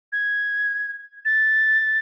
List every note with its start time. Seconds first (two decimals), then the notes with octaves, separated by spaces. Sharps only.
0.12 G#6
1.25 A6